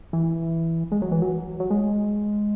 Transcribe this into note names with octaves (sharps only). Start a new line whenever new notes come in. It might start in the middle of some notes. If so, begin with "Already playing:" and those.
E3
G#3
F#3
E3
F#3
F#3
G#3